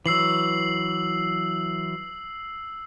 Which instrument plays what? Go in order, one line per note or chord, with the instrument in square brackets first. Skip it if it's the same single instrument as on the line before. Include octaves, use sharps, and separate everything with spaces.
[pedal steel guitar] E3 F#3 [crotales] E6 C7 F#7